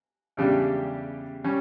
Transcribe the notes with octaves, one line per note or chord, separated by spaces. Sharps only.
E2 C#3 G3 D4 G4
G3 C#4